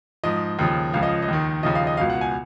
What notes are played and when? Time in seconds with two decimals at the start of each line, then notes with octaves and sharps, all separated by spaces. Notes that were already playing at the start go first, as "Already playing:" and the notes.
0.24 G#2 F3 D#5
0.59 D#2 C#3 F3
0.94 C#2 C#3 F3 F5
1.03 D#5
1.23 D#5
1.28 D#2 D#3
1.63 D#2 C#3 F3 D#5
1.75 F5
1.87 D#5
1.97 C#2 B2 F5
2.10 F#5
2.21 G#5